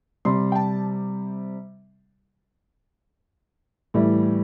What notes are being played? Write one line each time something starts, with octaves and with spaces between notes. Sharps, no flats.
C3 G3 C6
G5
A5
A2 E3 G3